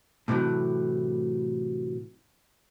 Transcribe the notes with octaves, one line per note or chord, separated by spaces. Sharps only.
A2 C3 E3 F#3 A3